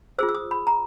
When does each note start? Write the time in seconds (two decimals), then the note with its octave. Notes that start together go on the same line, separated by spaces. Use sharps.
0.18 F4 G#4 C5 E6
0.29 E6
0.35 D#6
0.51 B5
0.67 A#5